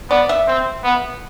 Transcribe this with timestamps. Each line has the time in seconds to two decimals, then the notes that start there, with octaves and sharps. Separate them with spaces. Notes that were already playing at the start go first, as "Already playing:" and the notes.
0.10 B3 D5
0.29 E5
0.47 C4
0.84 B3